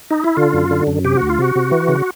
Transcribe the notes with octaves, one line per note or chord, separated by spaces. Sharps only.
D#4
E4
D3 F4
F#2
D3
F#2
C3 G4
D2 F#4
F4
C3 F#4
C3
E3
C#3